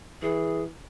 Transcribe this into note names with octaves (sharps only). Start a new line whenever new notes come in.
E3 G#4